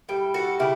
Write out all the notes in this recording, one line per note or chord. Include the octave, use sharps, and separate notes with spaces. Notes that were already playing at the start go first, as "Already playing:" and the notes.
A2 G3 G5
F#4 A4
C#3 E4 G4